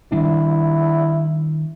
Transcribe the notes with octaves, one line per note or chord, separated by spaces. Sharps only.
D#3 G3 D4 E4